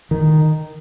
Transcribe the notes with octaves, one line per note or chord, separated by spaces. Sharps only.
D#3